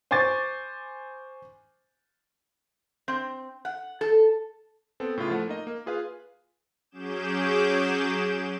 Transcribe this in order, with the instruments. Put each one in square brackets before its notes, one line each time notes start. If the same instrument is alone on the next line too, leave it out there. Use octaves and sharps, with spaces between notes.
[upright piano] C5 G#5 C#6 D6 A6
[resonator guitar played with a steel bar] C4
F#5
A4
[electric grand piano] B3 C4 A4
A2 C#3 F4
F3 A3 F#5
A#3 D#4 D#5
A#3
F4 G#4 B4 F5
[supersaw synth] F#3 C#4 G#4 D6 G6 E7